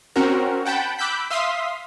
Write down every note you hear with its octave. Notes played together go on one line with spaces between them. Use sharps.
C4 C#4 F#4 A#4
F#5 G5 A5 B5 G6
B5 D6 E6 F#6 G6 B6
E5 F5 C6 D#6 B6